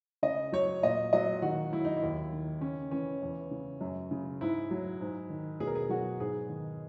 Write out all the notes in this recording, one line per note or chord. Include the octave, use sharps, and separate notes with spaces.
C#3 D#5
F#3 C#5
A#2 D#5
F#3 D#5
D#3 F#4
F#3 E4
D#4
E4
D#2
D#3
C#3 C#4
E3 C#4
E2
C#3
F#2
C#3
G#2 E4
F#3
G#2
D#3
B2 G#4
A#4
G#4
F#3 F#4
G#2 G#4
D#3